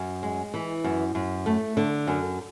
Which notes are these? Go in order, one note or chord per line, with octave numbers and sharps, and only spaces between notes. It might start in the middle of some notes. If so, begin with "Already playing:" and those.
Already playing: F#2
G#3
E3
F#2
F#2
A3
D3
F#2